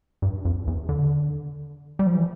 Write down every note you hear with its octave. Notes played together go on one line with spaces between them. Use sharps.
G2
F2
E2
D3
G3
F3
E3